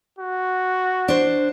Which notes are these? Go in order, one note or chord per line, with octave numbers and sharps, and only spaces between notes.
F#4
D4 C5